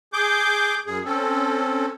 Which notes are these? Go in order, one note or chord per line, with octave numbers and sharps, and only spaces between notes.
G#4 D6 G6
F#2 G#4
C4 C#4 A4